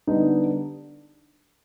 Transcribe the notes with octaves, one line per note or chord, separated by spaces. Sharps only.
D3 G3 B3 D4 D#4 D#5